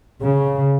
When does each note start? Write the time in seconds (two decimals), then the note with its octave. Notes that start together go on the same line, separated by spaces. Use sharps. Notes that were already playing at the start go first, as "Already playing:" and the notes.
0.23 C#3